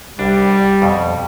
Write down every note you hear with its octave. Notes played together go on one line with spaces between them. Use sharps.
C2 G3 D4
F2 B2